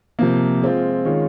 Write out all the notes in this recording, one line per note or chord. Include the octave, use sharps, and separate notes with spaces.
C3 F3 A#3
G#3 C4 F4
D#3 G#3 C#4 F4